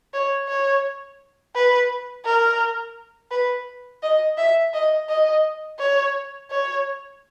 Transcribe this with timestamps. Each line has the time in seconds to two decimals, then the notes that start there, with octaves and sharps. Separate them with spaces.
0.14 C#5
0.48 C#5
1.55 B4
2.25 A#4
3.31 B4
4.03 D#5
4.38 E5
4.74 D#5
5.09 D#5
5.79 C#5
6.51 C#5